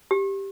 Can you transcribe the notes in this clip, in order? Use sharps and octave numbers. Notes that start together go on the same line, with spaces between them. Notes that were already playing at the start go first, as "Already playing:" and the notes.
G4